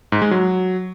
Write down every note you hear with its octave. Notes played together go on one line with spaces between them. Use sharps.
G#2
G#3
F#3